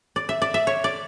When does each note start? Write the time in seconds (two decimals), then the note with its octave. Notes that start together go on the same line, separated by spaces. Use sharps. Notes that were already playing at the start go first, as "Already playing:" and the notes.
0.16 D5
0.29 E5
0.42 D5
0.54 E5
0.67 C#5
0.84 D5